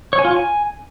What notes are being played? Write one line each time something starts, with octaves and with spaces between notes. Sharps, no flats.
C#5
G#5
F4
C#5
G#5